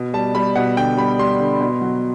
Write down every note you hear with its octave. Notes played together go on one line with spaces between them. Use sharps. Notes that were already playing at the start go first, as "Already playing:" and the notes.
Already playing: B2
G3 A5
G3 B5
B2 F#5
D3 G5
G3 B5
G3 C6
D3
B2
F#3